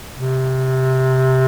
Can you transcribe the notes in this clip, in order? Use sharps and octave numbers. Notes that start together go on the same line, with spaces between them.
C3